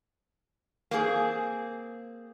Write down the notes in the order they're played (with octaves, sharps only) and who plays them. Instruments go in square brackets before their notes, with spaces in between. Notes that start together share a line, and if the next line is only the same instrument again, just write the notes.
[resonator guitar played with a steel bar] A#3 C4 F#4 G#4